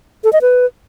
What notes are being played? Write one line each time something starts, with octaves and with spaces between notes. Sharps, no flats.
A4
D#5
B4